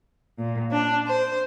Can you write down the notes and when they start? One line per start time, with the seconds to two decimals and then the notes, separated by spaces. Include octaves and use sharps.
0.39 A#2
0.72 D4
1.07 C5